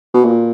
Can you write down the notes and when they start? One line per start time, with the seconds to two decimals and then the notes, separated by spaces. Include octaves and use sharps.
0.14 B2
0.25 A#2